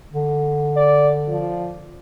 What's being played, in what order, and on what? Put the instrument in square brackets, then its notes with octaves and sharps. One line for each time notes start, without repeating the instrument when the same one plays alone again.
[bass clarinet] D3
[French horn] D5
F3